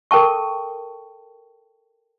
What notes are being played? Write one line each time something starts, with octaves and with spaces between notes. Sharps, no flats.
A4 A#4 G5 A5 C#6